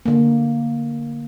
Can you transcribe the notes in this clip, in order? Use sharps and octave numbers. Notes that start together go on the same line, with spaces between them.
D3 A#3